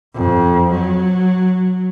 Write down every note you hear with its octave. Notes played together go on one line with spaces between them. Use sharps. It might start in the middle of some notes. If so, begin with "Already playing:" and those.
F2
F#3